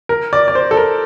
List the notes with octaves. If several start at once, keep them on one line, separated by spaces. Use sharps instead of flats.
A#4
D5
D5
C5
A4
A#4